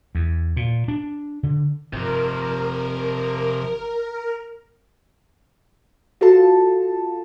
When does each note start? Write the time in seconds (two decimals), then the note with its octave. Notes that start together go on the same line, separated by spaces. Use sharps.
0.15 E2
0.57 A#2
0.88 D4
1.43 D3
1.93 G1 C3 F3 A#4
6.21 F4 F#4 A4 A5